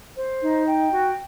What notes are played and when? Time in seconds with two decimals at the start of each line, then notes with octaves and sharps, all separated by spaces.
0.16 C5
0.42 D#4
0.67 G5
0.92 F#4